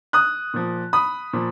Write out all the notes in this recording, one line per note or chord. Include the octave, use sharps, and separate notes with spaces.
D#6 F#6
A#2 F3
B5 D#6
A#2 F3